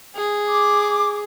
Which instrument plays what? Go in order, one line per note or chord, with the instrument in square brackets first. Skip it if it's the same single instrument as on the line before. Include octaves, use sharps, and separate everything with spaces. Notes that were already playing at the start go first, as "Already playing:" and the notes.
[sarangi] G#4
[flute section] D6